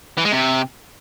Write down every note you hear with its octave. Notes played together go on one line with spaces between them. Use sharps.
E3
G#3
C3